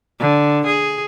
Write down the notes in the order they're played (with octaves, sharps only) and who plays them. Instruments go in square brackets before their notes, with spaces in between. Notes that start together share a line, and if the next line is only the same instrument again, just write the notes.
[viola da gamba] D3
G#4